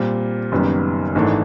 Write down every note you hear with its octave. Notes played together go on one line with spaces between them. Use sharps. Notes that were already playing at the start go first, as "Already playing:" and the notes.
Already playing: A#2 G3 C4
F#1 F#2 D#3 G3 B3
G#1 G#2 E3 A3 D4